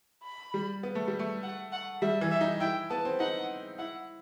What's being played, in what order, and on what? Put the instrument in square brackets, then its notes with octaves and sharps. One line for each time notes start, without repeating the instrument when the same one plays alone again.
[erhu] B5
[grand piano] G3
B3
A3
G3
A3
[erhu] F#5
F#5
[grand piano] G3 [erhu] E5
[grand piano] E3
[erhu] E5
[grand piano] D#4
[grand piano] E4 [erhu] G5
[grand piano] B3 [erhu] A5
[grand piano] C4
[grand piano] D#4 [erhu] F#5
[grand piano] E4 [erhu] F#5